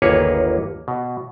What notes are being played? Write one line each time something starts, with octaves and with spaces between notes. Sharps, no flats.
G1 D#2 A#3 G#4 B4 C#5
B2